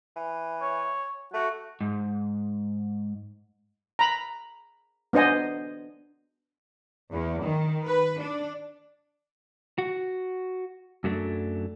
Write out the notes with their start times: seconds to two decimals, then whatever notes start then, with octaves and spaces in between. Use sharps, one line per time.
0.16 E3
0.62 C#5
1.34 A3 F#4
1.81 G#2
3.99 A#5 B5
5.13 B3 D4 C5 D#5 G#5
7.13 E2
7.45 D#3
7.86 B4
8.21 D4
9.78 F#4
11.04 F#2 F#3 A3 D4